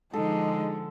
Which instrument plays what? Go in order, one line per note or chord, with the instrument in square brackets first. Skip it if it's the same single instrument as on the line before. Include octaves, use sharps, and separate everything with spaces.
[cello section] D3 G#3 [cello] F3 [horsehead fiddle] D#4 D#5 [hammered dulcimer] A4